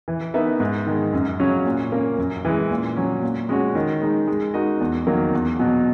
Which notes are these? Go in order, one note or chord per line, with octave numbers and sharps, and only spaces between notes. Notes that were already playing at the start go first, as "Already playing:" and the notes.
E3
B3 D#4 A#4 E5
G#2
D#3 G#3
F#2
C#3 F#3 C#4
A#2
A#3 C#4
F#2
E3 G#3
A#2
F#3 C#4
A#2
G#3 C#4 F#4
D#3
G#3 D#4
G#3
D#4 F#4 A#4 D#5
E2
D#3 F#3 A#3
E2
B2 F#3